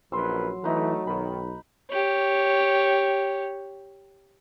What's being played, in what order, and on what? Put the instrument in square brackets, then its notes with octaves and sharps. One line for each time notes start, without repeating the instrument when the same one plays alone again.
[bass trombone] A#1 [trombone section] F#2 A#4 B4 [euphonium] F#3 [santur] C6 E6
[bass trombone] E3 [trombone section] A3 [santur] D#4 B4
[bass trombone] B1 [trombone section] D#3 [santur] B5
[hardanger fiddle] G4 C#5